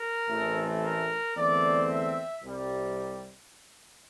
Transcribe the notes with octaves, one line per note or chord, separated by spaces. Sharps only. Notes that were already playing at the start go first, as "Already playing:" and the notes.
Already playing: A#4
A1 A2 E3 A3 C4
A#4
E2 D3 A3 C4 D5
E5
C2 C3 G3